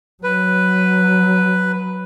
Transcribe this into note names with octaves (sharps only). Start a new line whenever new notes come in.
F#3 B4